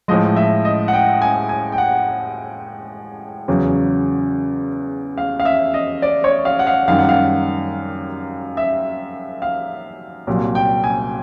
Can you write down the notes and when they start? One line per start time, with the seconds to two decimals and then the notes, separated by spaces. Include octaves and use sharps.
0.08 A2 F3 G#3 D#5
0.36 E5
0.65 D#5
0.88 F#5
0.93 G5
1.22 G#5
1.49 G#5
1.72 G5
1.78 F#5
3.48 E2 C#3 F#3
5.18 F5
5.40 F5
5.45 E5
5.74 D#5
6.02 D5
6.24 C#5
6.45 F5
6.59 F#5
6.67 F5
6.88 F#2 D#3 G3 F5
6.98 F#5
7.09 F5
8.57 E5
9.42 F5
10.27 C2 A#2 F#3
10.55 G5
10.84 G#5